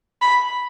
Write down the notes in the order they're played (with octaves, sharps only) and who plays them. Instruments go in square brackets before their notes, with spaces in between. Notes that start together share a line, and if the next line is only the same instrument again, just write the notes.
[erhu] B5